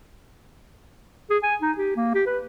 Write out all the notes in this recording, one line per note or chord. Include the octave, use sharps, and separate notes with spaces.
G#4
G#5
D#4
G4
A#3
G4
B4